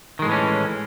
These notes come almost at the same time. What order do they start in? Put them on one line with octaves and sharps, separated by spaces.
D#3 G#3 A2 E3 C#4